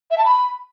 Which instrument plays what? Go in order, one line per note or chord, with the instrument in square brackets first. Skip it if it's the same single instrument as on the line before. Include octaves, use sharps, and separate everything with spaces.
[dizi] E5
A5
B5